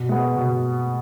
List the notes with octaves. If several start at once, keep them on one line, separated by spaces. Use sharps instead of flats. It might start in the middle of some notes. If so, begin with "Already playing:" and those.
Already playing: B2
G#3 B3
B2